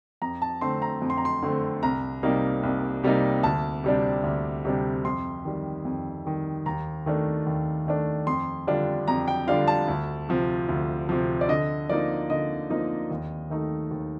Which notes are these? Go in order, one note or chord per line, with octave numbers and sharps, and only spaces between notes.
F2 A#5
A5
D3 A3 C4 C6
A#5
F2
C6
A#5
C6
D3 A3 C4
C2 A#5
C3 G3 A#3 D#4
C2
C3 G3 A#3 D#4
D2 A5
C3 G3 D4
D2
C3 G3 D4
F2 C6
D#3 G3
F2
D#3 G3
D#2 A#5
D#3 A3 D4
D#2
D#3 A3 D4
F2 C6
D3 G3 D4 F4
F2 A#5
G5
D3 G3 D4 F4 F5
A5
D2
C3 F3
D2
C3 F3
D5
D3 D#5
F3 A#3 D#4 D5
D3 D#5
F3 A#3 D#4
D#2
D#3 A3 D#4
D#2